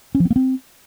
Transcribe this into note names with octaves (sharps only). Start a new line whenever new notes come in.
C#4
F3
C4
A#3
C4